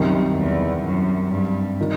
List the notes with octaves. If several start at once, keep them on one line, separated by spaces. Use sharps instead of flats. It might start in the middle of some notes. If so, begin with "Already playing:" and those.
Already playing: C2 F#2 C3 D#3 G3
E2
F#2
G2
D#3